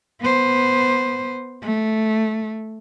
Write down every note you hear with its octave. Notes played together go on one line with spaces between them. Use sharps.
B3 C5
A3